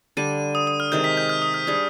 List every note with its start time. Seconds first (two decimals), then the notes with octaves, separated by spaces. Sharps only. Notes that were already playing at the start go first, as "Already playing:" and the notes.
0.17 D3 G3 D4 D#7
0.55 D#6
0.67 D#6
0.80 F6
0.92 C3 D#3 G#3 G6
1.04 B6
1.17 G6
1.29 F6
1.42 D#6
1.54 F6
1.67 G3 D4 G#4